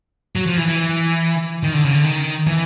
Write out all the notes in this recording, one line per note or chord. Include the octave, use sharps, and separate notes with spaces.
F#3
F3
E3
E3
D#3
D3
C#3
D3
D#3
E3